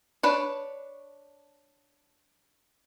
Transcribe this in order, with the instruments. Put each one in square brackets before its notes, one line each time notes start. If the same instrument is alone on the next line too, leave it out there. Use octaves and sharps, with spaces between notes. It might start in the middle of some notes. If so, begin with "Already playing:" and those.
[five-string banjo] D4 B4 C#5